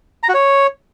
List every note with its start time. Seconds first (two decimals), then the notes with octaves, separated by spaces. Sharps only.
0.23 A#5
0.29 F#4
0.34 C#5